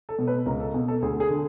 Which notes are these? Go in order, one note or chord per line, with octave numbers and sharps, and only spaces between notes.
A4
B2
B4
C#2 A#4
A4
B2
A4
D2 G#4
G#4
D3